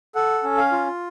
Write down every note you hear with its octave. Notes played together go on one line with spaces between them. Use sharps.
A4 F#5
C#4
F5
F4